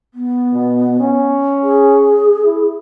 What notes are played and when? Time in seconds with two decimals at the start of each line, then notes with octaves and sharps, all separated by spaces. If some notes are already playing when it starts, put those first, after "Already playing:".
0.14 B3
0.53 B2
1.00 C#4
1.63 G#4
2.45 E4